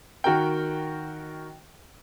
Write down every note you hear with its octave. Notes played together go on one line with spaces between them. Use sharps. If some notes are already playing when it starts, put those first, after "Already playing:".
D#3 F#4 A#4 G5